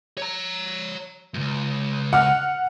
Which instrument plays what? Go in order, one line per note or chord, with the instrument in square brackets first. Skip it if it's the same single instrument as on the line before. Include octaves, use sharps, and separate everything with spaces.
[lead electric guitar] C#5 A#5
C#2 F#2
[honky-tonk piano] F#5 F6